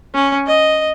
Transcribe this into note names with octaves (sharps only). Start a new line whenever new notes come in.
C#4
D#5